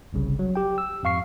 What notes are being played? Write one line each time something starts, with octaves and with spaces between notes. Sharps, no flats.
G1 C2 C#3
F#3
G4 G5
E6
F2 G#2 F5 C#6 C7